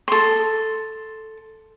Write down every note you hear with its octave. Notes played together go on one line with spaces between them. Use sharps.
A4 C6